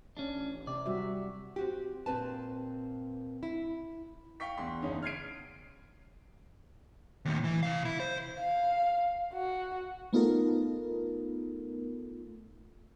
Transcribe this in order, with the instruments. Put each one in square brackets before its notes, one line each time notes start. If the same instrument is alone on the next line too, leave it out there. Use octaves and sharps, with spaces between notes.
[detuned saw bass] A1 [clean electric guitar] C#4 D4
[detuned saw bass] C3 [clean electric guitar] D5
[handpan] G3 F#4 E5
[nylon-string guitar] C4 F#4 G4
A#2 C4 B4 A5
E4
[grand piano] F5 G5 C#6 B6
E2 C6
F#1 E2 C#4 D#4
F6 G#6 C7 D7
[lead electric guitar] D#2 A2
E3
C3 F5
E4
C5
[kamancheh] F5
F#4
[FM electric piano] A3 B3 D#4 F4 A4 A#4